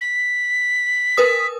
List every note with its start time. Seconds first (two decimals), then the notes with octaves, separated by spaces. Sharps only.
0.01 B6
1.17 A#4 B4 D#6